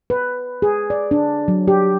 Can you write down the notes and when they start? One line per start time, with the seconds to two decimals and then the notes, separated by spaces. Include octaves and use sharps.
0.10 B4
0.62 G#4
0.90 D5
1.11 D4
1.48 F#3
1.68 G4